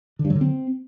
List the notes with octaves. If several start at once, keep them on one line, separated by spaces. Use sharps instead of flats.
D3
G2
F#3
D3
C4